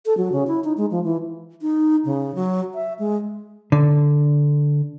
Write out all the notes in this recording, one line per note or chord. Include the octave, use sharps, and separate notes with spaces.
A4
F#3
C#3
E4
D#4
G#3
F3
E3
D#4
C#3
F#3
E5
G#3
D3